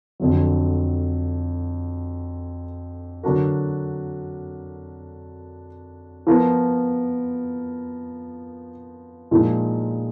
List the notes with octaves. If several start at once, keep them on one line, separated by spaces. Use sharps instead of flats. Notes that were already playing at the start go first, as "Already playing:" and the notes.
F2 D3 F#3
D3 F#3 D4 F#4 A#4
F3 B3 F4 A#4
A#2 F3 G#3 D#4 A#4